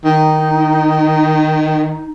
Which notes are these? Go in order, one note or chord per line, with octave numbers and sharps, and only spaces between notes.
D#3 D#4